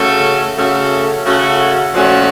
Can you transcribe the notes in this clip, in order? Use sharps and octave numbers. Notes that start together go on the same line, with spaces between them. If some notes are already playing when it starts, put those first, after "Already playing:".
Already playing: C#3 A3 C#4 F#4 A4
C#3 A3 C#4 F#4 A4
C#3 A3 C#4 F#4 A4
A#2 F3 A3 C#4 F#4